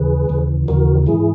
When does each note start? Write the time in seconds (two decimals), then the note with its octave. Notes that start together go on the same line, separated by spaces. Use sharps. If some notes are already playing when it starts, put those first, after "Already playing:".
Already playing: D#2 C#3 E3 G#4 B4
0.29 D#2 C#3 E3
0.68 D#2 C#3 E3 F#4 A#4
1.06 G#2 E3 E4 G#4